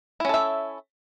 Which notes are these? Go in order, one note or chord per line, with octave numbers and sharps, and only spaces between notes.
C#4 E4 A4 E5